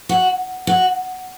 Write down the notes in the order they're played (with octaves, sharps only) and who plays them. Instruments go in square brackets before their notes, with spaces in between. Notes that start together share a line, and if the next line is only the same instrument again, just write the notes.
[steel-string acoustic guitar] F#4
F#4